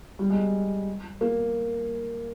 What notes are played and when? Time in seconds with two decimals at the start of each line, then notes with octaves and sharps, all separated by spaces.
0.19 G3
0.30 G#3
1.21 A#3